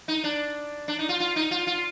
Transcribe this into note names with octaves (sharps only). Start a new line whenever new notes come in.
D#4
D4
D4
D#4
F4
F4
D#4
F4
F4